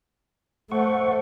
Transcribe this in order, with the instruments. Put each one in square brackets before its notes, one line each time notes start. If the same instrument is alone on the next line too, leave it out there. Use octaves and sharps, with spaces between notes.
[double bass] A3 [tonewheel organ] C5 F#5 C#6